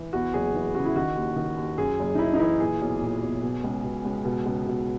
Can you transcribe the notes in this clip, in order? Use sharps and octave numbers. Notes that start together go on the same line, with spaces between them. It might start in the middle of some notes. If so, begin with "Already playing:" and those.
Already playing: E3
E2 F#4
F#1 G#4
E3
C#3 F#4
E4
D#3 F#4
D#2
D#3
D#2
F#2 G#4
F#1
D#4
F#1 E4
D#4
E3 E4
A#2 G#4
B1
A#2
B1
B2
C#2
B2
C#2
B2
C#2
B2